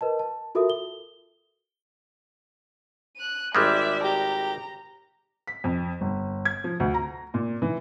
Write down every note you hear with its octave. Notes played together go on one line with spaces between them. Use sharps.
A#4 B4 D#5 A5
A5
F4 F#4 A4 A#4 E5 D#6
G7
F#6 D#7
G#1 G3 G#3 D5 E5
G4 A#5
B6
F2
G1
G#6
F3
D2
A#5
A#2
E3